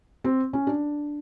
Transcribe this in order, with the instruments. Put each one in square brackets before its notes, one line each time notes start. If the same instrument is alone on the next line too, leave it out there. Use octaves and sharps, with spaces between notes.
[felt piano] C4
C#4
D4